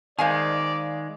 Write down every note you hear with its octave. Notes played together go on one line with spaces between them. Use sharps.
D#3 G#3 C5 D5 F5 G#5